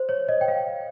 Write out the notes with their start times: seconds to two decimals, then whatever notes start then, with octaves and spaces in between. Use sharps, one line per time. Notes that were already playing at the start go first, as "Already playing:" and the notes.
Already playing: C5
0.09 C#5
0.29 D#5
0.41 G5
0.48 F5